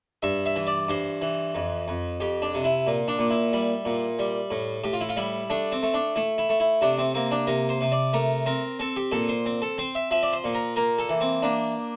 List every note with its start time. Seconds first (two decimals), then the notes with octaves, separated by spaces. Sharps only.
0.22 G2 E5
0.46 E5
0.56 E3
0.67 D5
0.88 G2 C5
1.21 E3
1.55 F2
1.88 F2
2.20 F2 G4
2.42 D4
2.54 C3
2.64 E4
2.87 A#2
3.08 D4
3.19 A#2
3.30 E4
3.53 G3
3.85 A#2
4.19 G3
4.51 A2
4.84 A2 G4
4.93 F4
5.01 E4
5.09 F4
5.16 G3 E4
5.50 A3 D4
5.72 C4
5.83 A3
5.94 D4
6.16 A3 E4
6.38 E4
6.49 A3
6.60 E4
6.81 C3 D4
6.98 C4
7.14 A#3 C4
7.31 D4
7.47 C3 A#4
7.69 C5
7.81 C3
7.92 D5
8.13 A3 A#4
8.46 C4 A#4
8.79 C4 A4
8.96 G4
9.12 A#2 A4
9.28 C5
9.46 C4
9.62 A4
9.78 C4 C5
9.95 E5
10.11 F3 E5
10.23 D5
10.33 C5
10.44 A#2
10.55 A#4
10.76 A#3 A#4
10.98 A4
11.09 E3
11.20 C4
11.42 A#3 D4